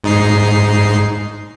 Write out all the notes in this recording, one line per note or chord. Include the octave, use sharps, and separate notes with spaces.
G#2 D#4 C7